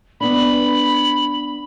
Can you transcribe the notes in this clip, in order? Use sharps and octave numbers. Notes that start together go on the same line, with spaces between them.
B3 D4 B5